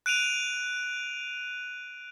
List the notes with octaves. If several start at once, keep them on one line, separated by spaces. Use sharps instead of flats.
F#6 D7 D#7 F7